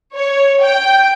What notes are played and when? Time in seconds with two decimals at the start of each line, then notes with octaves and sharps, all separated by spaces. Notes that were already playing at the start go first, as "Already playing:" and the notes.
0.14 C#5
0.60 G5